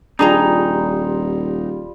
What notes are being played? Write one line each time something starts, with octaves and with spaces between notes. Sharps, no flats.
D#1 F3 G3 D4 D#4 G#4 A#5